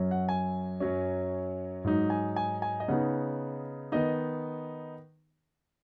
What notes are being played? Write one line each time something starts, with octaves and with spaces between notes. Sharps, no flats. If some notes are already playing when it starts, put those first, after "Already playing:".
Already playing: F#2 F#3 C#4
F#5
G#5
F#2 F#3 C#4
G#2 F#3 D#4
G#5
G#5
G#5
D#5
C#3 B3 D#4 F#5
D#3 B3 D#4 D#5